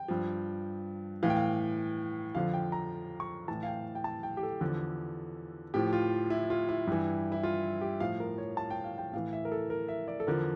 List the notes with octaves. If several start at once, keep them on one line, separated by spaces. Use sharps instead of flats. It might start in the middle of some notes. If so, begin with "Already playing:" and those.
Already playing: G5
G2 F3
A2 E3 F5
G5
F5
F2 D3 F3 F5
G5
A#5
C#6
A2 E3 A5
F5
G5
G5
A5
G5
G4
A4
E2 D3 F3
A2 F3 G4
F4
E4
F4
E4
G2 E3
E4
F4
G4
A2 F3 F5
A#4
C#5
A5
G5
F5
G5
A2 E3 F5
E5
A#4
A4
A#4
E5
D5
A4
E2 D3 F3 A#4